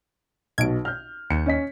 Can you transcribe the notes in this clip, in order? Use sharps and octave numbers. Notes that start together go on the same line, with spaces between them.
B1 B2 G#6 D7
F6 G6
D#2 C#7
C#4 D#5 B6